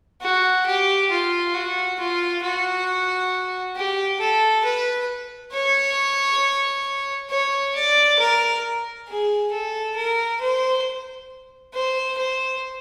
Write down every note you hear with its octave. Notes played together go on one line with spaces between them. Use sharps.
F#4
G4
F4
F#4
F4
F#4
G4
A4
B4
C#5
C#5
D5
A#4
G#4
A4
A#4
C5
C5
C5